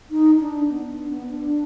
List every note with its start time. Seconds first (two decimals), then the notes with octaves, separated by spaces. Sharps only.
0.10 D#4
0.41 D4
0.70 B3
0.90 D4
1.09 B3
1.29 D4